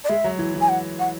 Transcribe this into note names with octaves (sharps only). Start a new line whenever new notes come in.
D5
G#3 E5
F#3
E3
E3
G#5
F#5
F#5